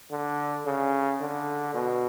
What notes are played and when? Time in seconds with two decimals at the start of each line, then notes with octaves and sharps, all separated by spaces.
0.11 D3
0.66 C#3
1.20 D3
1.74 B2